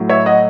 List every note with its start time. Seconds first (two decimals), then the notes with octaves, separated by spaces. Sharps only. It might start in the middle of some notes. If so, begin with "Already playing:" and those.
Already playing: A2 F#3
0.09 C#5 E5
0.26 D#5 F#5